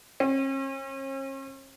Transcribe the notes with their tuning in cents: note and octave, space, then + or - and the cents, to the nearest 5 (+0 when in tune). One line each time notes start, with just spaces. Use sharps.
C#4 -45